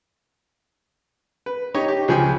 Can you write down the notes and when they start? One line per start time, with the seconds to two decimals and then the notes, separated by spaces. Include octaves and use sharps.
1.46 B4
1.74 D#4 G4 C#5
1.88 G4
2.08 C#2 F3 G#4 G5 G#5